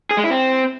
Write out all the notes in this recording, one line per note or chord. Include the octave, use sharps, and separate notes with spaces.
G#4
G#3
E4
C4